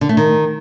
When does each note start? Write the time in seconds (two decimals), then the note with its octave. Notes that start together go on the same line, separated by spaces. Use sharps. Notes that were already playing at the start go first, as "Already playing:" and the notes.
0.01 D3
0.09 A3
0.17 D#3